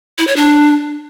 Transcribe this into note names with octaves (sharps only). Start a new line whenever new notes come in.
E4
C#5
D4